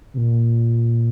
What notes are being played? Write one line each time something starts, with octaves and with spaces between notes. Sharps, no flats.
C3
A#2